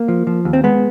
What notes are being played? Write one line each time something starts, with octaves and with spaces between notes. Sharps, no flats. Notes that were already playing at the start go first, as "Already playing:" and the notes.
Already playing: A#3
F3
F3
D#2
C4
G#3 B3